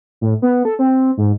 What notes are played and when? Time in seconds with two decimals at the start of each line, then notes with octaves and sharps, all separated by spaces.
0.21 A2
0.42 B3
0.65 A4
0.79 C4
1.17 G#2